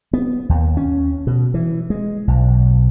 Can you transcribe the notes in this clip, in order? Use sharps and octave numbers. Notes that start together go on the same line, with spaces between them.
B3
D#2
C#4
B2
E3
G#3
B1